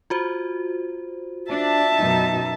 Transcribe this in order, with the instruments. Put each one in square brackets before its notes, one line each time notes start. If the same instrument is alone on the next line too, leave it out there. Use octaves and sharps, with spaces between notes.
[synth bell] F4 F#4 C5
[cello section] D4 [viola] E5 A5
[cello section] F#2 B2 D#4